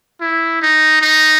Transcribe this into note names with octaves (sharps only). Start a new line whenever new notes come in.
E4
D#4
D#4